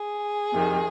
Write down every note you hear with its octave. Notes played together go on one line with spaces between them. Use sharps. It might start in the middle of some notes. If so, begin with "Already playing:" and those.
Already playing: G#4
F2 C3 D#3